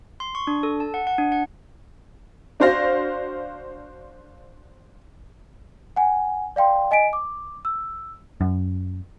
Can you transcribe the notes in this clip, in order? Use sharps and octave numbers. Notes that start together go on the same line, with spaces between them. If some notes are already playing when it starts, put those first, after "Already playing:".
C6
C#6
D4
A4
A5
F#5
F#5
D4
F#5
D4 F#4 C5 F5 A#6
F#5 G#5
D5 F5 G5 C6
D#5 G#5 B6 D7
D6
E6
F#2